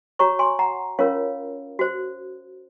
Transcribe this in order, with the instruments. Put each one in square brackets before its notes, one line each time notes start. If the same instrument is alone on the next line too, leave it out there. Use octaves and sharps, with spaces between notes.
[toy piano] F#4 C#5 A#5 C#6
G#5 C6
F#5 A#5
C#4 F4 A#4 C#5 F5
F#4 C5